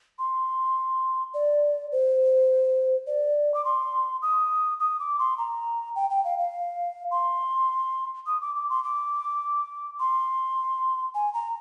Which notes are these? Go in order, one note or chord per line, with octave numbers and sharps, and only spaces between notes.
C6
D5
C5
D5
D6
C6
D#6
D#6
D6
C6
A#5
G5
G5
F5
F5
C6
D#6
D6
D6
C6
D6
C6
G#5
A#5